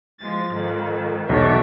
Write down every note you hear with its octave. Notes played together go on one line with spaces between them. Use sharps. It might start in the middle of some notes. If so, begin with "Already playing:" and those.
F3 G#3 A6
F2 G#2 D#3
B1 E2 C#5 D5 E5